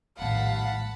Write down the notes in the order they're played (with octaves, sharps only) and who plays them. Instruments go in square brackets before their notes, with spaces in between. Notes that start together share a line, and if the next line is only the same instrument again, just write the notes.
[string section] A#1 D#2 [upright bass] A2 G#3 [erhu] F5 [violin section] F#5 A5 B5